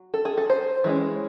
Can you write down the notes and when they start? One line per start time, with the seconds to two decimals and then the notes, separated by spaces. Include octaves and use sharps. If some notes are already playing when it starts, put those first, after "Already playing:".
Already playing: F#3
0.14 A4
0.25 G#4
0.37 A4
0.50 C5
0.84 E3 G#3 C#4